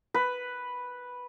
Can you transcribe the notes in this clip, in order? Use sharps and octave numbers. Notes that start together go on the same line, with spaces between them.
B4